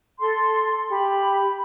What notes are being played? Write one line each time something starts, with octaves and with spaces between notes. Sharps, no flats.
A4 C6
G4 B5